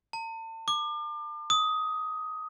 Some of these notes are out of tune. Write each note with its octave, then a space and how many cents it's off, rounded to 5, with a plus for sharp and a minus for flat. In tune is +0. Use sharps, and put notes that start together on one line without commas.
A5 +40
D6 +35
D#6 +15